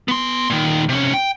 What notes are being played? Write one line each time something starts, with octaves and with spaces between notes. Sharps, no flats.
B3 C6
A#2 D#3
C3 C#4
G5